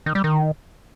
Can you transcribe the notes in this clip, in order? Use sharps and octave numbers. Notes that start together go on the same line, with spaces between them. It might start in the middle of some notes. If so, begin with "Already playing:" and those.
D#3
G3
D#3